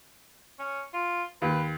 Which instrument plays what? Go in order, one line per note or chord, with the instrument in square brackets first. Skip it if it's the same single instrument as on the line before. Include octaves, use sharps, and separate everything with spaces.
[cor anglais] C#4
F4
[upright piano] D#2 [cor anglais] B4